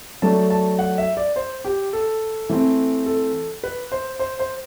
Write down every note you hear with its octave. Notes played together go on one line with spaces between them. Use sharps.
F#3 A3 D4 A5
A5
F#5
E5
D5
C5
G4
A4
E3 A3 C4
A4
B4
C5
C5
C5